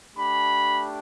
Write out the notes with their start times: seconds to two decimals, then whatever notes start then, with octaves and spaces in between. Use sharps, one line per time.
0.16 A3 D4 G4 B5